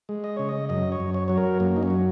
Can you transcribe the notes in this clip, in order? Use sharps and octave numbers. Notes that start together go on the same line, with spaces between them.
G#3
D#5
C#3 C#5
D#5
F#2 D#5
C#5
F#2
C#5
F#3 C#5
A#4
F#2 A#3
D#4
C#4
F#3